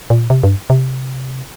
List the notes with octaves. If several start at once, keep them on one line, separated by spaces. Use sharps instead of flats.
A#2
C3
G2
C3